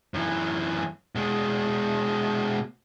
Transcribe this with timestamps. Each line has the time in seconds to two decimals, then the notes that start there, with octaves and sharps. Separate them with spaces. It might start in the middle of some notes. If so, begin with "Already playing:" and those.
0.14 F#2 E3
1.15 B2 G#3